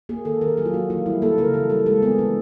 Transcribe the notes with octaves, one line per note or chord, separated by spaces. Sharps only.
A#3 G#4
D#3 A4
D#3 A#4
F#3 G#4
F4
A#3 F#4
E3 F4
G3 E4
A#3 A4
C#3 A#4
E3 A4
G3 A4
G#3 A4
B3 G#4
E3 D4